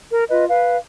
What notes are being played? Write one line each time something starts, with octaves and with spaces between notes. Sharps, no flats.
A#4
F4 B4 D#5
B4 F5